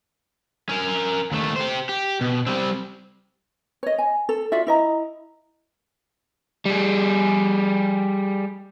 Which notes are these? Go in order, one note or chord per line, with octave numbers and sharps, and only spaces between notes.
C#4 A#4
D#2 A3
G4 C5
G4
B2
G3 C4
C#5 D#5
G#5
A4
F4 F#4 D5 E5
E4 D#5 A#5
G3 G#4